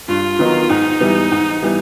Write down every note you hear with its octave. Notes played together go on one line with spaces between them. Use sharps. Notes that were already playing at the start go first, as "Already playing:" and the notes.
G2 F4
D#3 F#3 B3 D#4
G#2 D#4
E3 G3 B3
G#2
E3 G3 B3